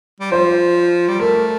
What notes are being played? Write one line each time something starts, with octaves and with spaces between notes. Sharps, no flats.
G3
F3 C5
G3
A3 A#4